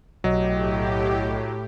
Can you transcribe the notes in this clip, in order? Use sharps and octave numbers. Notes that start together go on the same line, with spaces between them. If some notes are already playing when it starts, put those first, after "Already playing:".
B1 A2 F#3 G4 D#5